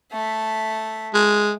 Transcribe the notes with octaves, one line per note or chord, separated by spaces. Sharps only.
A3 E5
G#3